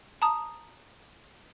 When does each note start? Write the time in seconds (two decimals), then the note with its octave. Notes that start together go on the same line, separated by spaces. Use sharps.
0.22 A5 A#5 D#6